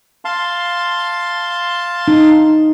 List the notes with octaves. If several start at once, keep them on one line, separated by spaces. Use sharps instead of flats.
F5 A5 C6
D#4